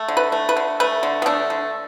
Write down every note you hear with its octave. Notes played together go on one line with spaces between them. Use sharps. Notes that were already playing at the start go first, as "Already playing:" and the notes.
Already playing: A3
D3
B4
A3
B4
D3
A3 B4
D3
B3
A3 D4
D3